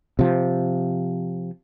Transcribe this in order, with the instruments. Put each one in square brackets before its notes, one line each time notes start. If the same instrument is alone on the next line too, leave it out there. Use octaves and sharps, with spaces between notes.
[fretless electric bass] C3 F3